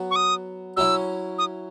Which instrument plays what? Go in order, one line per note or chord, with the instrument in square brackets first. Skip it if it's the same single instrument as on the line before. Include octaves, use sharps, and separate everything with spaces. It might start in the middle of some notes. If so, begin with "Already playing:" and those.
Already playing: [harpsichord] F#3 B3 F#4
[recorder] C#6
D#6
[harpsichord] F#3 C#4 E4 [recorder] E6
[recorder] D#6